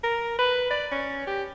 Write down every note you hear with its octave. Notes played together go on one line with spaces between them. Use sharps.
A#4
B4
D5
C#4
G4